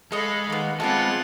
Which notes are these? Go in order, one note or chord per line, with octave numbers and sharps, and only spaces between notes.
G#3 A4 C#5 D#5 F5 B5
D#3 A#3 B3
G#3 B3 C4 F4 A4 F#5 G#5 D6